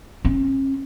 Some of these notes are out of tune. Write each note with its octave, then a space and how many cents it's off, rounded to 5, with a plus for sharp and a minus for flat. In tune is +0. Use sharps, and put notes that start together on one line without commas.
C#4 -40